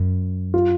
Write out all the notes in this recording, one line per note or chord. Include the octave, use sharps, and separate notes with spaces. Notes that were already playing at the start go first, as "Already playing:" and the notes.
Already playing: F#2
F4